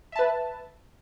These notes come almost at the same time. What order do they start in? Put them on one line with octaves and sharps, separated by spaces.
E5 A5 B4